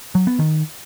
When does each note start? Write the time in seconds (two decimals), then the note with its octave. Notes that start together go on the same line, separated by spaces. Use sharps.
0.15 F#3
0.27 B3
0.39 D#3